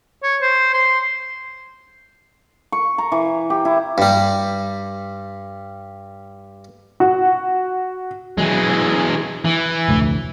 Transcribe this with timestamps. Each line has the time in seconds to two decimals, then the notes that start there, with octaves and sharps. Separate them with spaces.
0.23 C#5
0.42 C5
0.74 C6
2.72 C#6
2.98 A#5
3.12 E3
3.50 G4
3.65 E4
3.98 G2 G3
7.00 F#4
8.38 E3 F#3 G#3
9.45 E3
9.88 F1 D2 A2